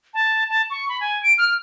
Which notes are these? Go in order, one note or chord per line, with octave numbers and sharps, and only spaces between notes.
A5
A5
C#6
B5
G#5
D7
F6